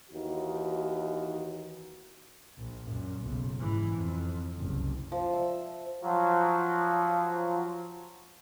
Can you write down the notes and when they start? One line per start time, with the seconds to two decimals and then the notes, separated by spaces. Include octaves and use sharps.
0.11 D#2 E3 D#4 F#4
2.58 A#1
2.88 F#2 A#2
3.20 F#1 B1
3.57 G#2 E3
3.94 F2
4.58 F#1 C2
5.12 F3
5.33 E5
6.03 F3 F#3